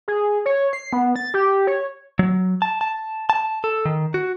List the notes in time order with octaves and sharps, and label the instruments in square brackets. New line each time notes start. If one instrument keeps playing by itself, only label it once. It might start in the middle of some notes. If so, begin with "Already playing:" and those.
[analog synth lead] G#4
C#5
C7
B3
A6
G4
C#5
[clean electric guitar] F#3
A5
A5
A5
A4
D#3
F#4